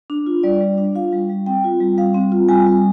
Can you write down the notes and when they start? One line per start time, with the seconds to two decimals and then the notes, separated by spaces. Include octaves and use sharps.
0.10 D4
0.26 F4
0.43 G3 D5
0.61 G3
0.78 D4
0.95 F4 F5
1.13 G3
1.29 G3
1.46 C4 G5
1.64 F4
1.80 G3
1.98 G3 F5
2.14 C4
2.32 F4
2.49 G3 G#5
2.66 G3